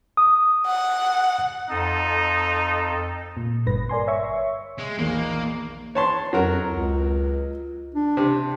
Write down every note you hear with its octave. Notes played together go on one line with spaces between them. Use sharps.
D#6
F#5
F2 D#4 A4
A#2
G1 G2 B4 A#6
A#4 D5 G#5 C6
C#5 E5 C#6
G#3
A#1 E2 D#3 A#3
C#5 A5 C6
F2 F#3 F#4 A#4
C#2
D4
C3